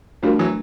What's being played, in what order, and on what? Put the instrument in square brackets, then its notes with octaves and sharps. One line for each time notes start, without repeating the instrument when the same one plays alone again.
[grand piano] F3 G3 [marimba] A3 D4 F#4 A#4
[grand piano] E3 F#3